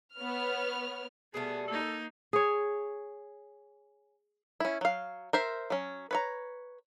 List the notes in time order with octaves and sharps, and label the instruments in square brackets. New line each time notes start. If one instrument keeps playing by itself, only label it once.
[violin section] B3 C#5 F6
[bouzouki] B2 G3 A3 [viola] B3 [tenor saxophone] G#4
[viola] A#3 D#4 [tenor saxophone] A4
[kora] G#4 C#5
[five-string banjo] C#4 E4
F#3 F5
A#4 C5 E5
F#3 C#4
B4 C#5 A#5